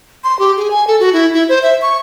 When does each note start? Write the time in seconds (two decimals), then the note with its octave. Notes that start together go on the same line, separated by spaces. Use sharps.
0.24 C6
0.39 G4
0.57 G#4
0.71 G#5
0.87 A4
1.00 F#4
1.13 E4
1.34 E4
1.49 C5
1.63 E5
1.82 C#6